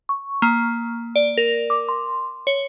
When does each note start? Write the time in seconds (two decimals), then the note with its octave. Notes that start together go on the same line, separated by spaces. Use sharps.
0.09 C#6
0.42 A#3
1.16 D5
1.37 A#4
1.70 D6
1.89 C6
2.47 C#5